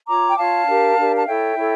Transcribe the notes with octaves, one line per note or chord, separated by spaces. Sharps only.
F4 C#5 A#5 D6
G5
F4 C#5 F5 A5
D4 G4 A#4
D4 G4 A#4
A5
E4 A4 C#5 E5 G5
E4 A4 C#5